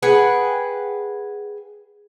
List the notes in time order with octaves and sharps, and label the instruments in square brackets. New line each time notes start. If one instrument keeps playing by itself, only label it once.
[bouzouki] G#4 B4 F#5 G5